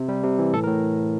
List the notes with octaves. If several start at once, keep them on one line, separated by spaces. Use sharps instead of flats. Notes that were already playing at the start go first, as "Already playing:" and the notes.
Already playing: C3
G3
C3
E3
A2 A4
A#4
A2